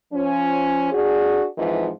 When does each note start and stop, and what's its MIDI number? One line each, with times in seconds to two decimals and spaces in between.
0.13 0.88 53
0.13 0.88 61
0.92 1.46 62
0.92 1.46 66
0.92 1.46 68
1.58 1.90 41
1.58 1.90 44
1.58 1.90 52
1.58 1.90 53